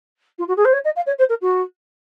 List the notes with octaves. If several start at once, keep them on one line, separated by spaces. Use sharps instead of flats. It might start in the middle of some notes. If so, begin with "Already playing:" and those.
F4
F#4
G#4
C5
C#5
D#5
F5
C#5
C5
A#4
F#4